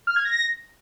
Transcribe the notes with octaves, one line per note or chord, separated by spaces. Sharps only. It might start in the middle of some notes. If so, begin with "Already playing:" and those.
F6
G#6
A#6